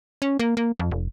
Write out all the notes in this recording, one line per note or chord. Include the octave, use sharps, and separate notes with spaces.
C#4
A#3
A#3
F2
F1